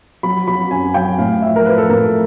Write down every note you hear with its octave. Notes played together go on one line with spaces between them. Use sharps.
F#3 B5
F#3 B5
F#2 G#5
F#3 G5
A2 F5
F3 E5
A#4
F3 B4
A4
A2 A#4